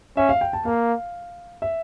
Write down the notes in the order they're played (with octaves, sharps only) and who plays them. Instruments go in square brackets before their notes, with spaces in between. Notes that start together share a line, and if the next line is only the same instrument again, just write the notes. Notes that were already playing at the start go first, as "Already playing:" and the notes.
[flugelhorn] C#4 [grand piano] E5
[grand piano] F5
G5
A5
[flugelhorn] A#3 [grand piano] F5
[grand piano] E5